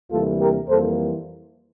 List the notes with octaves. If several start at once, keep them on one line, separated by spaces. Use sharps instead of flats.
D2 C3 E3 G3 A#3 F4 A4
G4 A#4
F2 E3 G3 A#3 A4 C5